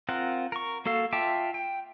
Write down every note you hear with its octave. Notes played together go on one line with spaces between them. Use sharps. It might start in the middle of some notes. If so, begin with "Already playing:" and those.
C4 F4 A#4 F#5
A#4 C#6
A#3 F#4 A4 F5
F4 E5 G5 A5 D6
G5